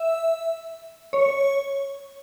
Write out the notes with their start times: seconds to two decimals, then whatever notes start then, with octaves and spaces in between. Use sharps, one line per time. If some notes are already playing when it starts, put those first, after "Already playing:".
Already playing: E5
1.13 C#5